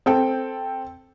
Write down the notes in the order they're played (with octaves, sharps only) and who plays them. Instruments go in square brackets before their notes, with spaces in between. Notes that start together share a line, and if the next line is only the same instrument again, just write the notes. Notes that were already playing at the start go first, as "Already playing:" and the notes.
[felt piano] C4 A4 G5